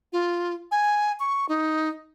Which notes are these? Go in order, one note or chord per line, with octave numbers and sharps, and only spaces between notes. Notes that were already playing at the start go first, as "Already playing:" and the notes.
F4
G#5
C#6
D#4